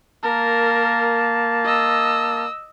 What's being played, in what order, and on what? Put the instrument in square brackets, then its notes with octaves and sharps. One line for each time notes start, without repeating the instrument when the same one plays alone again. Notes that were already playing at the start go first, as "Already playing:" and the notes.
[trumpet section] A#3 A5 [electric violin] A#4
[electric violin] D#5 E6